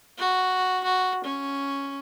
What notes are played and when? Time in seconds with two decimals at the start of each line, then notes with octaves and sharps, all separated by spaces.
0.18 F#4
0.84 F#4
1.24 C#4